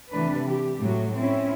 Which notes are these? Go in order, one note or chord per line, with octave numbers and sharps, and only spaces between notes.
C3 E3 A3 D4 B4
G4
A2 F#3
C4 C#4 E4